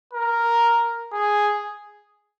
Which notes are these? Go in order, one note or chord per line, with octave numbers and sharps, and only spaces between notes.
A#4
G#4